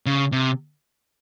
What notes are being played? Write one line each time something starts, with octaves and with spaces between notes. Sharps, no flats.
C#3
C3